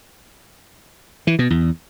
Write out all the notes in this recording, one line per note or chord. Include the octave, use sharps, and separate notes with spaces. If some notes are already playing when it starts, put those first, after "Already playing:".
E3
B2
E2